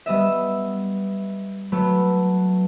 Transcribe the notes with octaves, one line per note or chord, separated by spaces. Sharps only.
G3 B3 D#5 E5
F#3 A3 B3